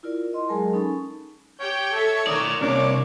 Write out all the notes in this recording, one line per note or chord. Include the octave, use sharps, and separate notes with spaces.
E4 F4 A#4 D5
D#5 C6
F#3 G#3 G#4 A#4 G#5 A5
C#4 D#4 A4 B5 C#6
G4 C#5 G5 G6
A4 E5
D#3 A#4 D5 D#6
C2 A#3 D4 C#5 D6